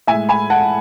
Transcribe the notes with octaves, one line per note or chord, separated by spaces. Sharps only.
A2 G#3 E5 G#5
G#5 B5
F#5 A5